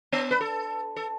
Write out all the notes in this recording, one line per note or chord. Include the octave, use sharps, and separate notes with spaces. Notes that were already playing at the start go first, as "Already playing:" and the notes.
B3
B4
A4
A4